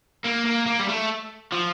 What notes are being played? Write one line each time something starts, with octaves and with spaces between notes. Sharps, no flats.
A#3
A#3
A#3
G3
A3
F3